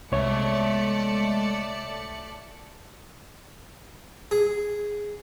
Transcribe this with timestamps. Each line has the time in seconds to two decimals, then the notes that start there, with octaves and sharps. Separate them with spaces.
0.12 C2 G#3 A3 C#5 D5 E5 C#7
4.31 G#4